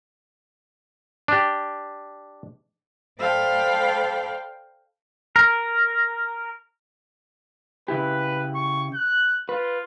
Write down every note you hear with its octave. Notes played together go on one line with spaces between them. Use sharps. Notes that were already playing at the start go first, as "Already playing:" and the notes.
D4 G4
A4 C5 D5 F5 G5 B5
A#4
C#3 E4 G4 B4
C#6
F#6
F4 B4